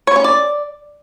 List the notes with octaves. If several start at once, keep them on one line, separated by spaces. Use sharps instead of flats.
C#5
C#4
D5